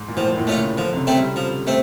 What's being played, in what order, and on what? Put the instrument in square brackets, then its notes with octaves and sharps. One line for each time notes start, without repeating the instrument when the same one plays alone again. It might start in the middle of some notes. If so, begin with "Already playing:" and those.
Already playing: [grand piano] G#2
A#2
[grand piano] A2 [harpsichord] F3
[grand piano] A#2
A2
[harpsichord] A3 C#4 F4
[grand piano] C#3
[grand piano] D3 [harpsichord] F3
[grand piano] C3
C#3
[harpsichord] A3 C4 E4
[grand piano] G3
[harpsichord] F3
A3 C4